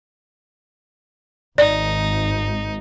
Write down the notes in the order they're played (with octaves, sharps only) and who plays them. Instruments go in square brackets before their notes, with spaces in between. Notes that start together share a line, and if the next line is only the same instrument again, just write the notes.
[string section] G#1 [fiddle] D#4 [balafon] D5